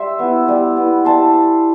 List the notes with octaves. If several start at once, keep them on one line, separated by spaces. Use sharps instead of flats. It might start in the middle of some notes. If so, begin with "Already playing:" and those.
Already playing: G3 C5 E5
B3 E4
G3
B3 E4
G3 A5 C6